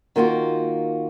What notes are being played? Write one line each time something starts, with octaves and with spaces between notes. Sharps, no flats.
D#3 A#3 F4 F#4